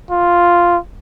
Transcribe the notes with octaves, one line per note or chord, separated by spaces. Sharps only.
F4